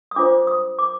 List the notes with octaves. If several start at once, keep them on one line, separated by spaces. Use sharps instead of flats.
D#6
D4 F4 C5 D6
D#6
D6